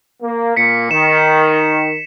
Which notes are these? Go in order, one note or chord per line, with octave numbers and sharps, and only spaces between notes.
A#3
A#2 A#3 B6 C#7
D#3 E7